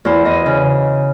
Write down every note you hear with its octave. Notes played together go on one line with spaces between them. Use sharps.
E2 C5
E2 D#5
C#3